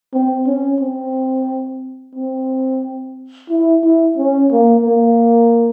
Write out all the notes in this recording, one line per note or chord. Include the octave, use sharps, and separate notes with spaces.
C4
C#4
C4
C4
E4
E4
C#4
A#3
A#3